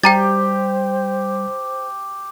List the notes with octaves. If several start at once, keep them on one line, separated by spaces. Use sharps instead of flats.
G3 G4 C5 G5 A#5 A6